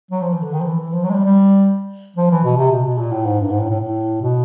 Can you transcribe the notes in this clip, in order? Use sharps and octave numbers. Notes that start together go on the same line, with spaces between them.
F#3
F3
E3
D3
D#3
F3
E3
E3
F3
F#3
G#3
G3
G3
F3
E3
B2
C3
B2
B2
A#2
A2
G#2
G2
G#2
A2
A2
A2
B2